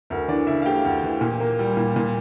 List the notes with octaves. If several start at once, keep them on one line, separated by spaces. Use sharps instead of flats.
D2 A#4
E3 D4 D5
C#3 E4 E5
F5
A3 G4 G5
D2
E3
A#2
A#3
G3
A#2
A#2